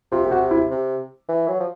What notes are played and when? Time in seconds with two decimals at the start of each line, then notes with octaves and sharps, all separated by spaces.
0.12 C3 F4
0.26 G4
0.31 F#4
0.51 E4
0.70 C3
1.28 E3
1.48 F#3
1.60 F3